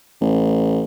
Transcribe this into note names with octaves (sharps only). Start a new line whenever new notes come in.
A1